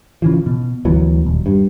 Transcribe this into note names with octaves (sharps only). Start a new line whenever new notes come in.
C#3 E3 F3
B2
D2 E3 F#3 B3
D#1
G2